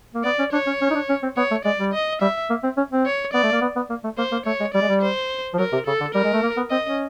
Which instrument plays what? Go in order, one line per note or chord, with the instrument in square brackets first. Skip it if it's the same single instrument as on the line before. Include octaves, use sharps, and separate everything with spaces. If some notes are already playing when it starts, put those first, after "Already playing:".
[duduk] A#3
[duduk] B3 [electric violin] D5
[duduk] C#4
[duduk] D4 [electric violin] C#5
[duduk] C#4
C#4
D#4
D4
C#4
C4
[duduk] B3 [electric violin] C#5
[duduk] A3
[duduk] G#3 [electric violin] D5
[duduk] G3
[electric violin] D#5
[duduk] G3 [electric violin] E5
[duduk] A#3
C4
C#4
C4
[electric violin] C#5
[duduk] B3 [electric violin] D5
[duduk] A3
A#3
B3
B3
A#3
A3
[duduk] A#3 [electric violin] C5
[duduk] A#3
[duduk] A3 [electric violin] C#5
[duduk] G#3
[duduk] G3 [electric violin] D5
[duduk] G#3
G3
[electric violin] C5
[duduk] F3
[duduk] F#3 [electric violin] A#4
[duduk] C3
[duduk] C#3 [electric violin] A4
[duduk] D3
[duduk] G3 [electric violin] A#4
[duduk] G#3
A3
A#3
B3
[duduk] C4 [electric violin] D#5
[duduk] C#4